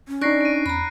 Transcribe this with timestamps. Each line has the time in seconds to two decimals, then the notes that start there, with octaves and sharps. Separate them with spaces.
0.08 C#4
0.22 D4 D#4 D5 C#6 F#6 A#6 C7
0.41 D7 D#7
0.66 E2 A#5 B5